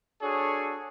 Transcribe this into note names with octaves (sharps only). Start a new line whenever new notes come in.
D4 F#4 G#4 A4 C#5